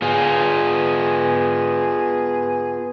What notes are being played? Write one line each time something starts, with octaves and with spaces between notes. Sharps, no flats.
B3 F4 G#4